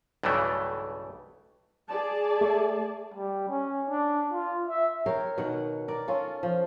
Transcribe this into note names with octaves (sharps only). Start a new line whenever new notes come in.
B1 G2 C#3 E3 A3
G#4 D5 A5
A3
G3
C#4
D4
F4
E5
A#4 C#5 F5 G5
B2 D#3 F#5
A#4 D5
C#4 F4 A4
F3